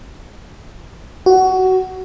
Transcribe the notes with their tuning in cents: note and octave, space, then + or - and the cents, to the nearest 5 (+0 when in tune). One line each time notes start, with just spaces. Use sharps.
F#4 +15